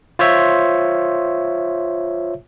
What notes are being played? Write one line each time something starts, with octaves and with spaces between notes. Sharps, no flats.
F4 C5 C#5 E5